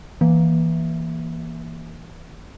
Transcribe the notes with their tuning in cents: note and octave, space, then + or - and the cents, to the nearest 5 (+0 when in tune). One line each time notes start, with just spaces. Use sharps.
E3 +0 A#3 +10